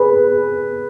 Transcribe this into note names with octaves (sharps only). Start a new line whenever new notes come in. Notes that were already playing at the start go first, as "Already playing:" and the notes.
Already playing: G#4 B4